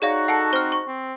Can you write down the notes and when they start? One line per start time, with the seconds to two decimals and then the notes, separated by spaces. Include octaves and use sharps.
0.02 D#4 F#4 G#4 C#5 D5 F5
0.28 A4 F#5 A5 C#7
0.53 C4 C5 F6
0.72 C#6
0.87 C4